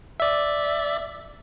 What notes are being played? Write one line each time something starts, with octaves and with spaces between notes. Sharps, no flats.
D5 E5